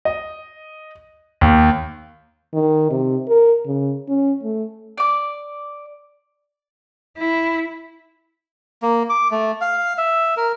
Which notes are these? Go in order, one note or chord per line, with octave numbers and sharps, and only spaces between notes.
D#5
D#2
D#3
C3
A#4
C#3
C#4
A3
D5 D6
E4
A#3
D6
A3
F5
E5
A#4